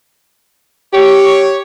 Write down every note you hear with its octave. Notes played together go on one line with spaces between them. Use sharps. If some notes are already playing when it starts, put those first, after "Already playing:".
G4 C#5